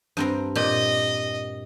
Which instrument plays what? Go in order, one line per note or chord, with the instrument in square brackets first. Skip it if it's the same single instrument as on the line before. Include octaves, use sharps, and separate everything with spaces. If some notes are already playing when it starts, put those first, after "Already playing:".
[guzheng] G2 C4 A#5
[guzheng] A#2 G4 [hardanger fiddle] D#5